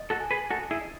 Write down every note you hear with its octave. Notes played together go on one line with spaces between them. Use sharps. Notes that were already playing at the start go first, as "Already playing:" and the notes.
Already playing: D#5
F#4 A4
G#5
G#4 B4
F#4 A4 D#5
E4 G#4
D#5